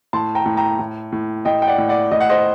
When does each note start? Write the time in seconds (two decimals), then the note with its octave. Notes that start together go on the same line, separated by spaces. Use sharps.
0.13 A2 A5 C6
0.35 G5 A#5
0.46 A2
0.57 G5 A#5
0.79 A2
1.12 A2
1.45 A2 D#5 G5
1.62 G5
1.67 D5 F#5
1.78 A2
1.89 D5 F#5
2.11 A2 D#5
2.20 F#5
2.29 C5 D#5